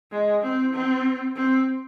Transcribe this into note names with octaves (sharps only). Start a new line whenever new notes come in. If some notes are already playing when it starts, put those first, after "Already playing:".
G#3
C4
C4
C4